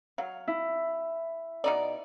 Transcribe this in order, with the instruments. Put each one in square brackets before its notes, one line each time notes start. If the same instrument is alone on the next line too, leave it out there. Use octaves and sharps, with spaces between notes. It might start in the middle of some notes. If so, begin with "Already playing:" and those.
[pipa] F#3 [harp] F5
[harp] E4
[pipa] B2 D#4 D5